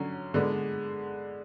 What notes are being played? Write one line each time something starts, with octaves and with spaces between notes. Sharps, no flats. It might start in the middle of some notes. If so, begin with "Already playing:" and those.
Already playing: D3 F#3 C#4
D3 G#3 B3 D4